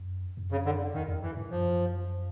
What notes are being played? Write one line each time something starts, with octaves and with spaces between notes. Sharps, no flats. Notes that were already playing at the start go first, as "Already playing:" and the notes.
Already playing: F#2
F#2
C#3
D3
E2 D#3
E2
F#2
G2 E3
G2
F#2 F3